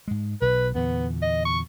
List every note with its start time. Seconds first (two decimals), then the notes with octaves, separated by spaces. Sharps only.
0.08 G#2 G#3
0.41 B1 B2 B4
0.75 E2 A#2 D3 B3
1.22 D#5
1.45 C#6